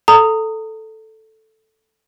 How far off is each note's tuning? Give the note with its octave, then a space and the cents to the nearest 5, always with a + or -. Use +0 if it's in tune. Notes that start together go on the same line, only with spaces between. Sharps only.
A4 +0 A#5 -30 D#6 +0